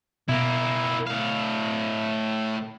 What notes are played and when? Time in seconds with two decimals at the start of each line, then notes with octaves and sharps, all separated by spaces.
0.28 B2 A#3 E4
1.07 A2 F5